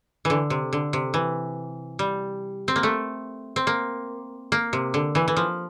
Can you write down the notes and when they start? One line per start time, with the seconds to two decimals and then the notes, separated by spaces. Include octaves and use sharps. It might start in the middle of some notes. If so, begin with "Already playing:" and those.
0.25 D3 E3
0.50 C3
0.73 D3
0.93 C3
1.14 E3
1.99 G3
2.68 C4
2.76 A#3
2.83 A3
3.56 C4
3.67 A#3
4.52 A#3
4.73 C3
4.94 D3
5.15 E3
5.28 E3
5.37 F3